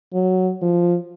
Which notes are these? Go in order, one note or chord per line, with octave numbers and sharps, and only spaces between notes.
F#3
F3